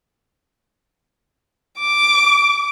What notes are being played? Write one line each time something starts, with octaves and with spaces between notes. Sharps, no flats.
D6